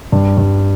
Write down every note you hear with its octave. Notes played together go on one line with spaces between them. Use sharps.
G2
G2